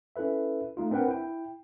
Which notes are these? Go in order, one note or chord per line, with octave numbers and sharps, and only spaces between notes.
C#4 E4 A4 B4 E5
A3 D#4 F4
C4 D4 A#4 B4 F#5 G5
E4 G5